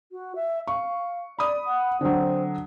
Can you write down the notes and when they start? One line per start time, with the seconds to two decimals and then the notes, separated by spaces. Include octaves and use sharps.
0.12 F#4
0.36 E5
0.67 F5 C#6
1.39 D5 B5 D#6
1.67 F#5
2.01 D3 F#3 C4